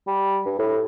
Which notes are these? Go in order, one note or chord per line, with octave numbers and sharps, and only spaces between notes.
G3
G2
A2